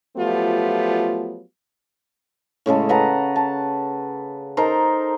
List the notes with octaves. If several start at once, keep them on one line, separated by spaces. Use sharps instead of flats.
F3 F#3 A3 B3 F4 G4
A2 C#3 G#3 A4
B4 F#5 A5 A#5
A5
D#4 A4 A#4 C5